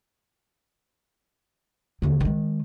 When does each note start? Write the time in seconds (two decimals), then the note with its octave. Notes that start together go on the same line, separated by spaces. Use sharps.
2.02 D#2 D3
2.20 D#3 G#3